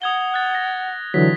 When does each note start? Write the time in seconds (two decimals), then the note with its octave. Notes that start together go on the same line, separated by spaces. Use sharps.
0.02 F#5 D#6 G#6 G7
0.34 F#6 A6
0.55 A#6
1.14 D3 E3 F#3 F4 B6